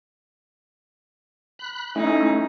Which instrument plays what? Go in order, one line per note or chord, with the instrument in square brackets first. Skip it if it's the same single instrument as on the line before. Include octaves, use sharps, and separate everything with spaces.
[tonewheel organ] B5 F#6
[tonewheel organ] A3 C#4 E4 [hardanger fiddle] D#4